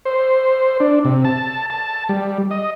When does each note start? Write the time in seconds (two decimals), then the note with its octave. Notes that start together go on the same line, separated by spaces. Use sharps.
0.05 C5
0.80 D4
1.05 C3
1.25 A5
1.70 A5
2.09 G3
2.51 D#5